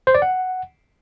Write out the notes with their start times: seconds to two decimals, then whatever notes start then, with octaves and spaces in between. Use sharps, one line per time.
0.07 C5
0.15 D5
0.22 F#5